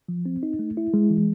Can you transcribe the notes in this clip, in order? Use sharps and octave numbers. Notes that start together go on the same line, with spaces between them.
F3
C4
D#4
A3
E4
G#3
E3